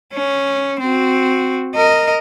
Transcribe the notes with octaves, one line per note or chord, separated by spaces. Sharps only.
C#4
C4 F#4
A#4 D#5